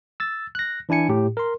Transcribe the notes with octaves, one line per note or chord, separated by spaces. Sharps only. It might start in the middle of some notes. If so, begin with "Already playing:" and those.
E6 A6
F#6 A#6
E3 D4 E4 G#5 C#7
A2 G4
A#4 C6